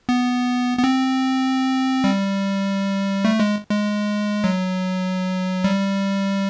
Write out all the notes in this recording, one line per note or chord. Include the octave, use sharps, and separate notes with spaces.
B3
B3
C4
G3
A3
G#3
G#3
F#3
G3